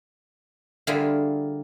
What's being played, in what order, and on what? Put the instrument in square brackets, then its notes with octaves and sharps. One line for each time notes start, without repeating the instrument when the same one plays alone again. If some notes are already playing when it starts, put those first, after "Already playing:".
[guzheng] D3 G3 A#3 E4 F4 G#4